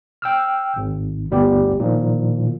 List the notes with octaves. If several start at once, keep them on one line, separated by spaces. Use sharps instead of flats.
G5 E6 F6
G#1
G1 D2 G3 B3 G4
A#2 D#3 F3